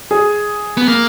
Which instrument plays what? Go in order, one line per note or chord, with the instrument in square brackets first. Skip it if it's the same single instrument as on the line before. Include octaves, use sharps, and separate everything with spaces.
[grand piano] G#4
[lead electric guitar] B3
A#3